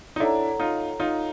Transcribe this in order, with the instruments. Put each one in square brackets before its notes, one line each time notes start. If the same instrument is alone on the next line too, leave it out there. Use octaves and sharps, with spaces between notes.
[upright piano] D#4
[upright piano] D4 E4 [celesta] A4 C#5 F#5 A#5
[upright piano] D#4 F4
D#4 F4